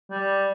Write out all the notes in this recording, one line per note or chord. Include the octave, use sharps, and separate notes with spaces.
G3